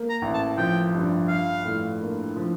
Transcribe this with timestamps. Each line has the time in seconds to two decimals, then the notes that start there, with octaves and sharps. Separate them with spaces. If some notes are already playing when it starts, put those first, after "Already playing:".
Already playing: A#3
0.10 A#5
0.22 A1
0.34 A5
0.58 F3 G5
0.94 G2
1.29 F4 F5
1.65 A2
2.00 A#3
2.36 F3